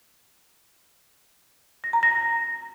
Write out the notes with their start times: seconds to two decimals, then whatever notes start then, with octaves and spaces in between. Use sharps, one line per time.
1.84 A#6
1.93 A#5
2.03 A#6